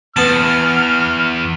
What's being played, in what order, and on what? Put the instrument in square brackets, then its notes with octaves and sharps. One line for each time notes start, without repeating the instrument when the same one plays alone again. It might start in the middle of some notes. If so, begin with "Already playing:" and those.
[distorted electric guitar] E2 [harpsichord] B3 A5 [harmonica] F6